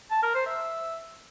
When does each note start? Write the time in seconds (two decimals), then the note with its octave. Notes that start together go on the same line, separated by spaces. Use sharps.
0.11 A5
0.23 A#4
0.34 C5
0.46 E5